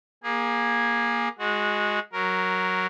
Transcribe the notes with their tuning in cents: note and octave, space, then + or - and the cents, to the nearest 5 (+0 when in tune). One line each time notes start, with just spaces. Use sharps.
A#3 +20 G#4 -15
G#3 +5 F#4 -20
F#3 +0 A#4 +0